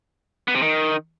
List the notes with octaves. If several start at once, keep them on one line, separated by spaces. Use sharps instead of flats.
B3
C3
D#3